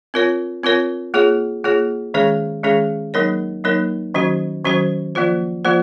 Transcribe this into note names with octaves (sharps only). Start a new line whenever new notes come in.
C4 F4 A#4 C#5
C4 F4 A#4 C#5
A#3 F4 G#4 C#5
A#3 F4 G#4 C#5
D#3 G#3 C#4 G#4 C#5
D#3 G#3 C#4 G#4 C#5
F#3 A#3 D#4 A#4 C#5
F#3 A#3 D#4 A#4 C#5
D#3 F#3 C#4 F#4 C5
D#3 F#3 C#4 F#4 C5
F3 A#3 F4 C5
F3 A#3 F4 C5